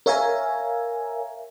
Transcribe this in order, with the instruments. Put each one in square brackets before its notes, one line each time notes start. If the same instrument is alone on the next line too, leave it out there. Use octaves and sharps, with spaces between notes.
[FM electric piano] A#4 C#5 E5 F5 G#5 A#5